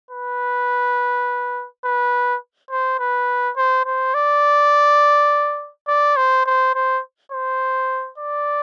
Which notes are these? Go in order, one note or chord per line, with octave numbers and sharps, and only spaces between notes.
B4
B4
C5
B4
C5
C5
D5
D5
C5
C5
C5
C5
D5